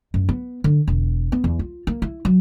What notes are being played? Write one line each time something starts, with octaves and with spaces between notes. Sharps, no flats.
F#2
B3
D3
E1
B3
E2
F4
A#3
E4
F#3